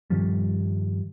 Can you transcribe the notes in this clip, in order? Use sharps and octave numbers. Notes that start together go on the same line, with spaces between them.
G2 D#3 F3 G3